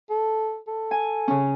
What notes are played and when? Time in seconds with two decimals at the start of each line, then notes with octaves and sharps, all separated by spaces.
0.10 A4
0.67 A4
0.91 G#5
1.28 C#3 C#4